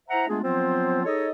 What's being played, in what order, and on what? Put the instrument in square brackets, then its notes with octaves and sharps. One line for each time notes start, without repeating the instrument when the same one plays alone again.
[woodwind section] E4 C5 E5 F#5 A#5
G#3 A3 B3 D4 F4 G#4
F3 F#3 B3 C4 F4 C5
D#4 G#4 A4 C#5 D#5